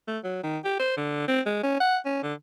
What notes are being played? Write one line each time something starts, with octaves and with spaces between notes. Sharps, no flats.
A3
F#3
D#3
G4
C5
D3
C4
G#3
C#4
F#5
C#4
D3